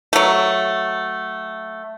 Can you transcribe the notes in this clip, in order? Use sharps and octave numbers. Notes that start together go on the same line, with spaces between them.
F#3 A3